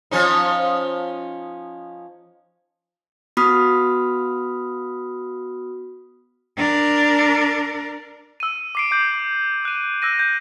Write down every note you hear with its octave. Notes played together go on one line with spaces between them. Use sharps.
F3 C#4 D#4
B3 F#4 B5 D#6 F6 B6
D4 A#4
E6 D#7
D6 C7 D7
D6 G6 C7 F#7
F#6 D#7
E6 F#6 A#6 D#7
G6